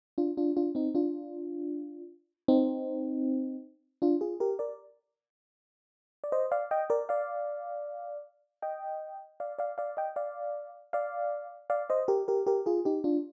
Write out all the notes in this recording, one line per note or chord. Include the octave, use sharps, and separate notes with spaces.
D4 F4
D4 F4
D4 F4
C4 D#4
D4 F4
C4 D#4
D4 F4
F4 G#4
G4 A#4
A#4 D5
D5
C5 D#5
D5 F5
D#5 G5
A#4 D5
D5 F5
D#5 G5
D5 F5
D5 F5
D5 F5
D#5 G5
D5 F5
D5 F5
D5 F5
C5 D#5
G4 A#4
G4 A#4
G4 A#4
F4 G#4
D#4 G4
D4 F4